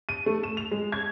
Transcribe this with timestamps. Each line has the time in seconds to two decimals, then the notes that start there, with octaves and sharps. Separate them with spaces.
0.09 D#7
0.26 A3
0.43 E7
0.57 F7
0.71 G#3
0.92 G#6